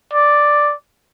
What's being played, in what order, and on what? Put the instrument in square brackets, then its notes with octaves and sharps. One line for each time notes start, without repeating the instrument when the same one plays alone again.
[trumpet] D5